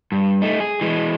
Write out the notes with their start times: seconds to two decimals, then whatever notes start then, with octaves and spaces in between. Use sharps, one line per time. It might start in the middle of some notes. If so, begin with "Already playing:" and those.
0.12 G2
0.42 A3 D#4
0.60 G#4
0.81 E3 G#3